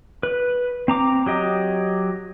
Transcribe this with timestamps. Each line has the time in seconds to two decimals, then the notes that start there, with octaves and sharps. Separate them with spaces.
0.23 B4
0.88 C4 A#5 D6
1.26 F#3 G4 D#5